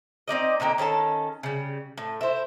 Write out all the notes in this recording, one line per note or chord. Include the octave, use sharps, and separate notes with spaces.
C4 D#4 D5 D#5
A#2 D3 D#4 G5
D#3 C#4 A4 A5
C#3 G3
A2
E4 C5